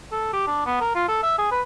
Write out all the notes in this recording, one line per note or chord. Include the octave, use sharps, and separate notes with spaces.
A4
G4
D4
B3
A#4
F4
A4
E5
G#4
B4